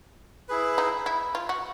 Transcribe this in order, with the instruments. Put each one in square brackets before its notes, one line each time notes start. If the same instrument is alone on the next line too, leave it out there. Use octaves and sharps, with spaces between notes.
[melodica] E4 G#4 B4
[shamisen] D#4
E4
F4
F#4